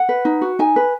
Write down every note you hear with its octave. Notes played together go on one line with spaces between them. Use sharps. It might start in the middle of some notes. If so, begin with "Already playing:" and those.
Already playing: F#5
B4
D#4
F#4
D#4 G#5
B4